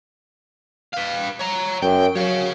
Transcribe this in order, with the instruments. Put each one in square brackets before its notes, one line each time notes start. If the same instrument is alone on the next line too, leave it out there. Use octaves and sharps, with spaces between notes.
[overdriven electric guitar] B4 F5
C#5 A#5
[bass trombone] F#2 [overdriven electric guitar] G5
[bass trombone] F#3 [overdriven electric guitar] C#5 F5